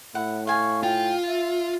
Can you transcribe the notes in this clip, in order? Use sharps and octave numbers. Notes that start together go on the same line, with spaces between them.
A2 E4 F#5
F5 G#5 C#6
F4 G5
E5